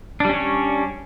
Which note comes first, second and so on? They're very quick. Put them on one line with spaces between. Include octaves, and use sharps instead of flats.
D4 G3 C#4 C#5